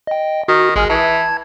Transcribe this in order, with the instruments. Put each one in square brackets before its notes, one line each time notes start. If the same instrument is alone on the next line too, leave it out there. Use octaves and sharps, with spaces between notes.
[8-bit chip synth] D#5 G5
[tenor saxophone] D#3 [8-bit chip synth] F#4
[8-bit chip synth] A1 G#5 F6 [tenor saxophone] G#3
[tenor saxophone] E3 [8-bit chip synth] A5 G#6